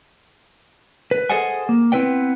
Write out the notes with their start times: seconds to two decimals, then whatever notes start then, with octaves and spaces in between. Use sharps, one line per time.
1.11 B4
1.30 G#4 A4 C5 D#5 F#5 G#5
1.69 A#3
1.92 B3 C4 E4 B4 D5 G5